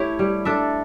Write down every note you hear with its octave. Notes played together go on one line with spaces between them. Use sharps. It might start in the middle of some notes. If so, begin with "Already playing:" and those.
Already playing: A3 E4 G4 C#5
G3
D4 A4 E5